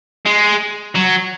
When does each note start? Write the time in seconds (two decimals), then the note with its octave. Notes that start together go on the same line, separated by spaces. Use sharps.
0.26 G#3
0.96 F#3